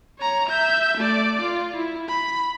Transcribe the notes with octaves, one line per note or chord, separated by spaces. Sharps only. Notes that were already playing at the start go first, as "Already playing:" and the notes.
C#5 A#5
E5 G6
A3 D5
F4
E4
B5